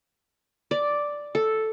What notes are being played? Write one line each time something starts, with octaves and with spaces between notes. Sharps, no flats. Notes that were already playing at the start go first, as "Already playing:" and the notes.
D5
A4